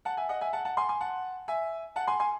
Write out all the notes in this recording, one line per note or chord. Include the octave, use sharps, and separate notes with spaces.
F#5 A5
E5 G#5
D#5 F#5
E5 G#5
F#5 A5
F#5 A5
G#5 C6
G#5 C6
F#5 A5
E5 G#5
F#5 A5
G#5 C6
G#5 C6